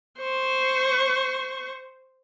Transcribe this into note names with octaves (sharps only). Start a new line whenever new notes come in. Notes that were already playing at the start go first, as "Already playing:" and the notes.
C5 C#6